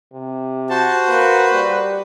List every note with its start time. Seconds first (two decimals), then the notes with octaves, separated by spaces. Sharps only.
0.13 C3
0.70 F#4 C5 A5
1.08 A#3 B4
1.53 G3